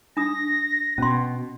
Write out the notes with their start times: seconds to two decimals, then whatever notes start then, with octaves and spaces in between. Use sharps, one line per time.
0.17 D4 D#6 A#6
0.98 B2 C#4 C6